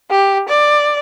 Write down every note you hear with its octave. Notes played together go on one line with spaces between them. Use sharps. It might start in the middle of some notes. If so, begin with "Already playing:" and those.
G4
D5